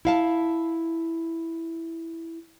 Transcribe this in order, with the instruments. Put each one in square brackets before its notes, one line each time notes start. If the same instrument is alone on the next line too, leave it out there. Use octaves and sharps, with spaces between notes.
[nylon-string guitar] E4 F5 A5